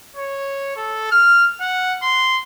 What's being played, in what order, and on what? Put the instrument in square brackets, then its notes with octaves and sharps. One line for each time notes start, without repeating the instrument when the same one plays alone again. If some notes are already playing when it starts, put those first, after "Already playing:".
[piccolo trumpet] C#5
A4
F6
F#5
C6